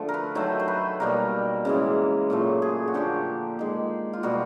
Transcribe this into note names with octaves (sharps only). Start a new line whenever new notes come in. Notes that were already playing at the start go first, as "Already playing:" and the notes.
Already playing: D3 F3 A3
A#4
B4
D#3 F#3 A3 C5
C5
B4
B2 G3 A#3 A#4
C#3 E3 G#3
A#2 F#3 A3
G#4
F#4
D3 F3 A#3 G4
D#3 G#3
F4
B2 G3 A#3 F#4